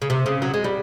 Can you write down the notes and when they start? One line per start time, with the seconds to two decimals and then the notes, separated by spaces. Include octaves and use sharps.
0.02 C#3
0.10 C3
0.26 C#3
0.42 F#3
0.54 G#3
0.64 G3